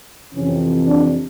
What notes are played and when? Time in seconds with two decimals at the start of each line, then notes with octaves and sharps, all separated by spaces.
0.33 F2 C3 E3 C#4
0.87 D4